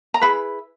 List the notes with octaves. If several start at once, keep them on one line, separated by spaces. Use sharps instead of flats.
A#5
E4 G#4 B4 B5